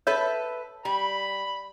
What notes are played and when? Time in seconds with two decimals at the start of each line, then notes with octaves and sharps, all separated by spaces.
0.07 A4 B4 C#5 E5 G6
0.85 G3 B5